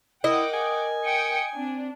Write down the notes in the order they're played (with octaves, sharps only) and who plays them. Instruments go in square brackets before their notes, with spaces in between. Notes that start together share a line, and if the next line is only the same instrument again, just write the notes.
[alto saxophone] E4 [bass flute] A#4 [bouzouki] D#5 [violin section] F#5 G5 D6
[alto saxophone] G#5
[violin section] G5 D#6 C#7
[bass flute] C4 [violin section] D4